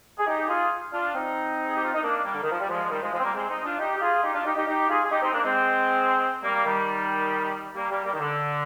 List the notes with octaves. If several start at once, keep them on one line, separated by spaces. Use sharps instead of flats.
G#4
D#4 G4
F4 G#4
D4 F4
C4 D#4
G#4
G4
F4
D#4
A#3 D4
G3 A#3
D3
D#3
F3
G3
F3 G#3
D#3 G3
F3 G#3
F3 G#3
C4
G3 A#3
G#3 C4
C4 D#4
D4 F4
D#4 G4
G4
F4 G#4
D#4 G4
D4 F4
D#4 G4
D#4 G4
D#4 G4
F4 G#4
G#4
D#4 G4
C4 D#4
A#3 D4
G#3 C4
G3 A#3
D#3 G3
G3 A#3
G3 A#3
G3 A#3
D#3
D3